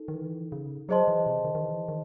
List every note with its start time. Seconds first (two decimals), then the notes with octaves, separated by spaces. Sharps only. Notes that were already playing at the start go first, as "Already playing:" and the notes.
Already playing: D#4 A4
0.08 D#3
0.15 E3
0.52 C#3
0.89 F#3 G#4 C5 D#5 A5 C6
1.08 E3
1.26 C3
1.45 D#3
1.55 D#3
1.63 E3
1.88 D#3